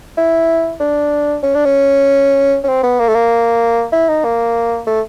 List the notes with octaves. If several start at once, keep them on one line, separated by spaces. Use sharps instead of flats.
E4
D4
C#4
D4
C#4
C#4
C4
B3
A#3
A3
A#3
E4
D#4
A#3
A3